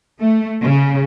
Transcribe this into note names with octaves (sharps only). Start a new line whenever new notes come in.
A3
C#3